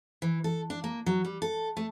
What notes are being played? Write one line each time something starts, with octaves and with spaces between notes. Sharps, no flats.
E3
A4
D4
A#3
F#3
G3
A4
A3